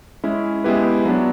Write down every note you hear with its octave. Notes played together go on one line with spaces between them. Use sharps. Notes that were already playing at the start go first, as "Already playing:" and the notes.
G#3 C#4 E4
G#3 B3 E4 G4 B4
F#3 B3 D4